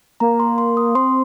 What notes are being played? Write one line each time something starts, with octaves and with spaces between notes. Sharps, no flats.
A#3 A#5
C6
C6
D#6
C4 C6